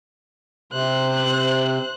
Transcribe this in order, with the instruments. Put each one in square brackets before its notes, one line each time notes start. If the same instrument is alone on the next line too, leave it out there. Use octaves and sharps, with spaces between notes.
[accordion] C3 [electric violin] C5 F#6